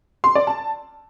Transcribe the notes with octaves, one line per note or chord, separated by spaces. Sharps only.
C6
D5
A5